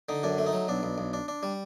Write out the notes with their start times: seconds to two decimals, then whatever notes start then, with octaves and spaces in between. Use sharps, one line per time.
0.09 D3 D#4
0.23 F#2 D4
0.38 A3
0.46 D#4
0.53 F#3
0.68 B1 D4
0.83 B1
0.98 B1
1.13 D4
1.28 D4
1.43 G3